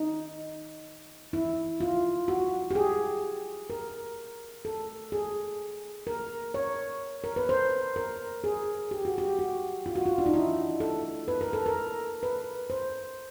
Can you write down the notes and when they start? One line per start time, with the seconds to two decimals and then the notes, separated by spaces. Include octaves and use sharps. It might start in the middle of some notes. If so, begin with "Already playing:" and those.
Already playing: D#4
1.33 E4
1.81 F4
2.28 F#4
2.71 G4
2.75 G#4
3.70 A#4
4.65 A4
5.12 G#4
6.07 A#4
6.54 C#5
7.24 A#4
7.36 B4
7.49 C5
7.96 A#4
8.44 G#4
8.91 G4
9.05 F#4
9.18 G4
9.39 F#4
9.86 F4
9.95 F#4
10.06 F4
10.18 D4
10.26 D#4
10.34 E4
10.80 A4
11.28 B4
11.41 A#4
11.53 A4
11.66 A#4
12.23 B4
12.70 C5